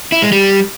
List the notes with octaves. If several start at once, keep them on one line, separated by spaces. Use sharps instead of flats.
E4
G#3
G3